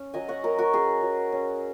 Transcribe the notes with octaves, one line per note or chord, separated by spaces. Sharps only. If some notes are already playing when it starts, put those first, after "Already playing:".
Already playing: C#4
F#3 D#5 G#5
C#5 F#5
F#3 A#4 D#5
F#4 A#4
C#4 G#4
F#3
C#4